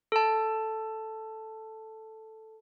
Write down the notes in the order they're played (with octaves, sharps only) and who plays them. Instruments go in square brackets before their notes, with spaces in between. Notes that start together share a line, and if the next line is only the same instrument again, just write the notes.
[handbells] A4 A5